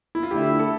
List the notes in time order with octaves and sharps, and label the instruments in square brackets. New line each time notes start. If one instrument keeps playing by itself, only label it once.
[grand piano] E4
F4
[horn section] D3 A3 E4 [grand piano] G4
[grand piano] A4